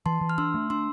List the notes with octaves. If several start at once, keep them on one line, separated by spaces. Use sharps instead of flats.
E3 A5 C6
E3
F6
D4 C6 E6
A3
D4 C6 E6